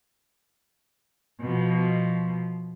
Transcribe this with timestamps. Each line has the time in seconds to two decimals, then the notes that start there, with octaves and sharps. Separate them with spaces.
1.41 B2 F3